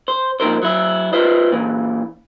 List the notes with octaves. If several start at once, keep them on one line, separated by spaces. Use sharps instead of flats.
C5
F2 A#2 D#4 A#4 C5
F#3 E4
F4 B4 C5 D#5
A#2 E3